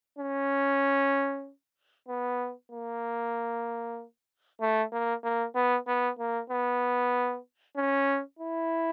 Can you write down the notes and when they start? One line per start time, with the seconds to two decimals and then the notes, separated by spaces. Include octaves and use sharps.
0.19 C#4
2.08 B3
2.72 A#3
4.61 A3
4.93 A#3
5.24 A#3
5.55 B3
5.88 B3
6.19 A#3
6.50 B3
7.77 C#4
8.39 E4